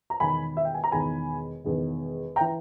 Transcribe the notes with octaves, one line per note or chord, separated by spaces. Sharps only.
A#5
E1 E2 D#3 G#5 B5
E5
G5
G#5
A#5
E1 E2 D#3 G#5 B5
E1 E2 D#3
G5 A#5
E3